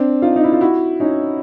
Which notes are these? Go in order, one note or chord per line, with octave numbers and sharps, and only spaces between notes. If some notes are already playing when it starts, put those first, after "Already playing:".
Already playing: C4 D4
D#4 F4
D#4
E4
F4
E4 F#4
C#4 D#4